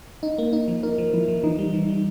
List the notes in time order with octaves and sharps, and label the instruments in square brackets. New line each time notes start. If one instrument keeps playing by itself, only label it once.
[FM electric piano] D#4
A#3
D#4
F3
[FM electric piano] D#4 [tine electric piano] A#4
[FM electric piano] F3
[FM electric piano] F3 [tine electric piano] E4
[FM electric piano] F3
[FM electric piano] E3 [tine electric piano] D#4
[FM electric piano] G3
E3
G3